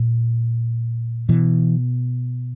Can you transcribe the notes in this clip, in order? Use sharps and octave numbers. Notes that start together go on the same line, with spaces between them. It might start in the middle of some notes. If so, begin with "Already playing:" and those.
Already playing: A#2
B2 E3